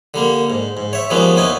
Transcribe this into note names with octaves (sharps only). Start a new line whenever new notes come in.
D3 G3 A#3
G#2
G#2
C#5 E5
D#3 F3 G3 G#3 B3 C#4
D#2 B3 C#4 D#4 E4 G#5